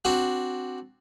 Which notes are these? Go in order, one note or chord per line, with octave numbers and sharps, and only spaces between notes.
C4 D4 F#4